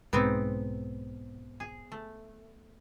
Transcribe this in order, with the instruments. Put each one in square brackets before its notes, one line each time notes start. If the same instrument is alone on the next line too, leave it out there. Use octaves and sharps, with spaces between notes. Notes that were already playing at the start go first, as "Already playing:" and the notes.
[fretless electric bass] B1 G#2 [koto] B3 C4 D#4
[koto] G#4
A3